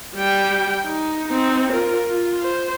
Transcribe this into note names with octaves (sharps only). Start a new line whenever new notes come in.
G3 G5
D#4
C4 D#4
F4 A#4
F4
C5